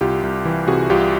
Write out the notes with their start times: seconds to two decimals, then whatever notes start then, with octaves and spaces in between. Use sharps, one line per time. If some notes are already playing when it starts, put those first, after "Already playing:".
0.01 C2 F4 G4
0.23 C2
0.45 E3
0.68 C3 F#4 G#4
0.90 C2 F4 G4